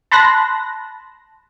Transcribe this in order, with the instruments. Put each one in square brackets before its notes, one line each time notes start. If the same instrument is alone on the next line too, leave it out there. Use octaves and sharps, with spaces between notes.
[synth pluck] A5 B5 C6 F#6 A#6